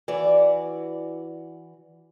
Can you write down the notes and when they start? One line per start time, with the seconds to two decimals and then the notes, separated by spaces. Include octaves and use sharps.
0.08 E3 F#4 D5